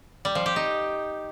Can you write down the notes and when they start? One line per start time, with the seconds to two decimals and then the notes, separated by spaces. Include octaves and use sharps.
0.25 G3
0.35 F3
0.46 G4
0.56 D#4